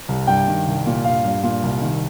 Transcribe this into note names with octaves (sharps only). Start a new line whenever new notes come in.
C2
G2 G5
D#3
C2
A#2
G2 F5
G2
A#2
C2
D#3